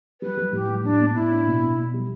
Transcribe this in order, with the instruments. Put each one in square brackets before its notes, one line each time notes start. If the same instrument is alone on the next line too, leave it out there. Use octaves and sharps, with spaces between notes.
[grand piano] G3 [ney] B4
[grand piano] G3
[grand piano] A2 [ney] G4
[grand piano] G3
[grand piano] A2 [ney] D4
[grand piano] B3
[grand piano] A2 [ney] E4
[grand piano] D4
B2
B2
B2
G3